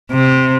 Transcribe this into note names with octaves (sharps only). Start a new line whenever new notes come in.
C3